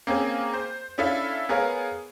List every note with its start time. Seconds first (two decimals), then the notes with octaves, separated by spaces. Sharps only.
0.07 A#3 C4 C#4 G#4
0.54 C5
0.98 C#4 D4 E4 A4 E5 F5
1.49 B3 G#4 A#4 C#5 F5